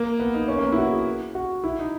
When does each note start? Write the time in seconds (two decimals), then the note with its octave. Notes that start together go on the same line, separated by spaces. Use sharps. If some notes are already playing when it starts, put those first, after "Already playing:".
Already playing: A#3
0.20 B3
0.34 D#4
0.48 C#4
0.58 A#3
0.63 B3
0.72 E4
0.78 F#4
0.92 G#4
1.35 F#4
1.64 E4
1.79 D#4